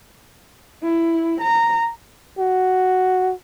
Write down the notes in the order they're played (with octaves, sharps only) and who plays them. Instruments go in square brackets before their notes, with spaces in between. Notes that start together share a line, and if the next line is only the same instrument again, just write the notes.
[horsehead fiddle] E4
A#5
[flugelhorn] F#4